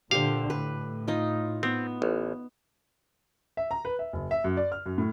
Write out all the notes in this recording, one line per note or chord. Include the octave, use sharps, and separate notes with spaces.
A#2 D3 G4 C5 F5
A2 B4
D#4 F4
B3 C4
A1
E5
A#5
B4
E5
F#1
E5
F#2
D5
F6
F#2
A2